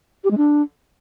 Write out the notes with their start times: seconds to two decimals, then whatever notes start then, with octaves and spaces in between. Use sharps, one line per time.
0.24 G4
0.31 G#3
0.37 D4